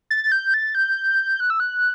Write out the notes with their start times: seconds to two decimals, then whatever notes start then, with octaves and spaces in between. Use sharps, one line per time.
0.10 A6
0.24 A6
0.32 G6
0.54 A6
0.75 G6
1.40 F#6
1.50 E6
1.60 F#6